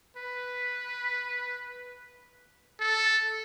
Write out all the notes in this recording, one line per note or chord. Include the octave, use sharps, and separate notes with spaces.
B4
A4